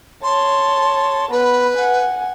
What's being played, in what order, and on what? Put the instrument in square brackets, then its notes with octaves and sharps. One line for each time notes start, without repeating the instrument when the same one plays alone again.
[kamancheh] C#5 A5 [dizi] C6
[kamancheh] B3 B5 [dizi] B4
[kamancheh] F#5 G#5